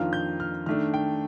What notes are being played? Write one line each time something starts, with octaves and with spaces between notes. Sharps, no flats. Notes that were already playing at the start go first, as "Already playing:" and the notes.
Already playing: F2 D#3 A#3 D4 F4 F6
G6
F6
D#3 A3 D4 F6
G5